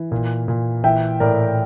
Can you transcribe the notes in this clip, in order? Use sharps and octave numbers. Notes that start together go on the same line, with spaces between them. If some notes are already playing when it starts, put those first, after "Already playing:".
Already playing: E3
A#2
A#2
E3 E5 G5
A2 A#4 D5